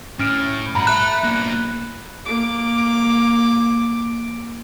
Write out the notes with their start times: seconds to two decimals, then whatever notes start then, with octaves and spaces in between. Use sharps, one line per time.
0.19 A2 C#4 F6 D7
0.75 G2 F#4 A#5 B5
0.87 E5 A5 F#6
1.24 B1 A#3
2.25 A#3 D6